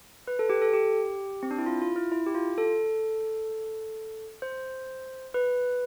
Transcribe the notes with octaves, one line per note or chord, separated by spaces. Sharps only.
B4
A4
G4
A4
G4
C4
D4
E4
F4
F4
E4
E4
G4
F4
A4
C5
B4